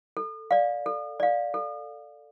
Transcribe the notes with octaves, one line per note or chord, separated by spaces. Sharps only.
A4
D5 F5
A4
D5 F5
A4